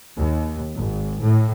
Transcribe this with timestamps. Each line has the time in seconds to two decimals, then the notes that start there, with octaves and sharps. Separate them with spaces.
0.17 D#2
0.76 G#1
1.21 A2